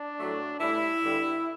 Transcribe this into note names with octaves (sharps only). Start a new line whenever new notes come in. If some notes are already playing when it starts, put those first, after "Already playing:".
Already playing: D4
A2 F#3 A3
A2 G3 E4
G2 D3 G3